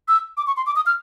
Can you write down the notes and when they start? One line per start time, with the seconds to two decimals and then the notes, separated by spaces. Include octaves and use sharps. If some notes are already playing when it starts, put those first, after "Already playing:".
0.08 E6
0.37 D6
0.47 C#6
0.57 C6
0.66 D6
0.76 D#6
0.86 F6